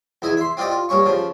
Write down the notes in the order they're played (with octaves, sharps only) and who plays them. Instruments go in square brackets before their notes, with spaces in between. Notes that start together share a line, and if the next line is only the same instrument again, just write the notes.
[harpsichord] E2 E4 D#5 G#5
E5 C6
C4 F4 G4 D5 D#5
F4
G2 A#3 C#4 C#6
C#3 F3